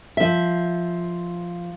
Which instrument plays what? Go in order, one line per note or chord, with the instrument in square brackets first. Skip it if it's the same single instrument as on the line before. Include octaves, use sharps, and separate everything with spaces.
[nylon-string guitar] F3 E5